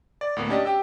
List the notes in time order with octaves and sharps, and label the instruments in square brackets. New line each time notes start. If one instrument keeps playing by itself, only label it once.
[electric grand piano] D5
D2 A2 A#3 B3
C#4 D4 G4 D5 D#5
G4 G5 E6